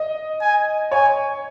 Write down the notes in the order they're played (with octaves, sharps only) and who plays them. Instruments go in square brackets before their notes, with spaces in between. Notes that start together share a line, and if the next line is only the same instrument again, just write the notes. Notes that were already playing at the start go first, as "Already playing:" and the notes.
Already playing: [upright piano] D#5
[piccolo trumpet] G#5
[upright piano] C#5 [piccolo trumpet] G#5